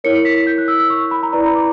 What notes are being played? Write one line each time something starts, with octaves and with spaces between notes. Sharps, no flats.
E4 A#4 C#5 C#7
C#7
B6
B6
G6
F#6
E6
E6
C#6
B5
A#5
E4 B4 D5 A#5
B5
D6